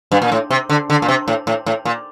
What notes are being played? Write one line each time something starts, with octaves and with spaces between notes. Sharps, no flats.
G2
A#2
A2
C3
D3
D3
A#2
C3
A2
A2
A2
A#2